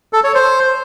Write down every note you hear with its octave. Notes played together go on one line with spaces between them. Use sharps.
A4
C#5
C5